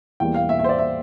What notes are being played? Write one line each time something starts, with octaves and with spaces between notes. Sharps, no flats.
E2 E3 G3 A#3 G5
F5
E5
E5
C5
D5
E5